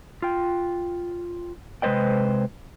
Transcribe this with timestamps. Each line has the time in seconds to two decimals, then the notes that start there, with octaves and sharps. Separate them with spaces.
0.22 F4 G5
1.82 C3 G#3 B4 C5 D#5 G5